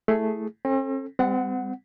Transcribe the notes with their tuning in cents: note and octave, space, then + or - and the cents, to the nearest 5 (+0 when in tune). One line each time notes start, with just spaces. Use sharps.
A3 +0 E4 +0 G#4 +0
C4 +45 A4 +0
G3 +30 C4 -35 F#5 +0